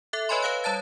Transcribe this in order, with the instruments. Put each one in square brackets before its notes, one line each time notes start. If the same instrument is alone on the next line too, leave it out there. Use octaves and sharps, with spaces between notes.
[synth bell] A4 E5 F#6
B4 C#5 D#5 G#5 B5 C6
B4 C#5 F5 E6 F#6
G3 C#5 A5 A6